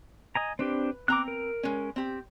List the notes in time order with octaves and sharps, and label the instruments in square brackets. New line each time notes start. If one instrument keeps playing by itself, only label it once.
[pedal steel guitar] D#5 G#5 A#5
[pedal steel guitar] C4 D4 G4 [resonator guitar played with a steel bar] B4
[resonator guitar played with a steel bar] C4 A#5 [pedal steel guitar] D6 F#6
[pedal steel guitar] A#4
[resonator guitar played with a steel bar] G#3 C#4
C4 G4